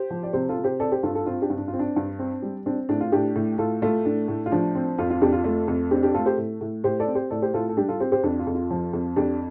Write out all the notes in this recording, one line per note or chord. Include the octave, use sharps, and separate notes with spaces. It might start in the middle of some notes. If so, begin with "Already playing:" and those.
Already playing: G4 C5
F3
D5
C3 G4 C5
F4 A4
C3
G4 C5
C4 A4 D5
G4 C5
G2 F4 A4
F4 A4
C4 F4
D4 G4
G2
D4
F4
C4
D4
G2
C4
G3
C4 D4
A2 D4
F4
A2 D4 G4
A2
A2 F4 A4
A3 F4
A2 D4
A2
F4
F3 D4
C4
F2 F4
F4
F2 D4 G4
F4
A3 F4
F2
C4 D4 G4
D4 G4
A3 F4 A4
G4 C5
A2
A2
A2 G4 C5
A4 D5
C4
G4 C5
A2 A4 D5
G4 C5
A2 F4 A4
A4
G3 D4 G4
F4 A4
C4 G4 C5
G4 C5
F2 D4 G4
F4
F2
F4
F3
F2
F2 D4 G4